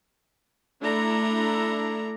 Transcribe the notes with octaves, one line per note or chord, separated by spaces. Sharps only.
A3 D4 E4 A4 A#5